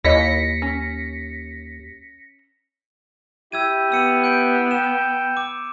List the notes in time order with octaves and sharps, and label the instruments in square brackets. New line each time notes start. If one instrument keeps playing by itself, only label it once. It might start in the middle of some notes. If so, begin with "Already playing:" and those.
[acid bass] D#2 [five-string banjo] E4 C#5 D#5 [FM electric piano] A#6 B6 C#7
[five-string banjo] C#4
[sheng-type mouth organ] E4 G4 [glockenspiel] E6 G#6 D#7
[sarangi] B3 [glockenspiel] E6 C#7 D#7
[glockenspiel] G6 D7
[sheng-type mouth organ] G5 [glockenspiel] E7
[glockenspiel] D6